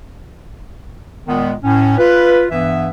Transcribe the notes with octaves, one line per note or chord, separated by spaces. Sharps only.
A#2 D#3 G#3 B3
A2 C#4
F4 B4
G2 E3 B3 E5